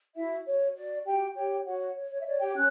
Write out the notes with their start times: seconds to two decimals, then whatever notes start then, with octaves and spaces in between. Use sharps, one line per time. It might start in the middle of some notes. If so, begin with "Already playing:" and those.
0.15 E4 F#4 E5
0.45 F#4 C#5
0.75 F#4 D5
1.05 F#4 G4 G5
1.35 G4 C#5 G5
1.65 F#4 C#5 F#5
1.96 C#5
2.10 C#5
2.21 E5
2.25 C#5 D5
2.40 G4 G5
2.55 C#4 F#6